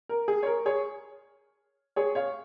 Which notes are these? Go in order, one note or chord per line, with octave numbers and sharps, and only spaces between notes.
A#4
G#4
C#5
A#4
G#4 C#5
G#4 C#5
C#5 F5